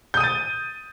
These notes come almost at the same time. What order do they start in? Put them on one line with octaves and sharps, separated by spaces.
G6 D#6 D#7 A6